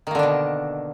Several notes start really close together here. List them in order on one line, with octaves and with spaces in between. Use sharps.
D#3 A#3 D3 D4 B2